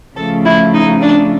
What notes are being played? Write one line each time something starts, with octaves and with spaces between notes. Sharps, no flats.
C#3 F3 A3 A4
E4
D#4
D4